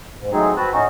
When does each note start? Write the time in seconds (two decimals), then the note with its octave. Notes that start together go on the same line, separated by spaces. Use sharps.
0.20 G#2
0.32 A2 F#3 G#3 C4 D#4 G#4
0.57 C4 F#4 B4 A5 F#6
0.73 A2 C#4 D#4 F#4